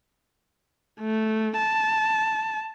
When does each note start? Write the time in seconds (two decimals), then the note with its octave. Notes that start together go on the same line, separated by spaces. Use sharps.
1.00 A3
1.58 A5